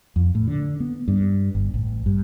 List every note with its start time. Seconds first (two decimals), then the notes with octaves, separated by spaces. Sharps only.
0.16 F2
0.35 A2
0.47 D3
0.80 B3
1.08 G2
1.55 G1
1.74 A1
2.06 G2